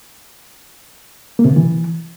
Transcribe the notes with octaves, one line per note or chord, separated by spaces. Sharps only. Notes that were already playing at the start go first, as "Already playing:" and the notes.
A#3
C3
D3
E3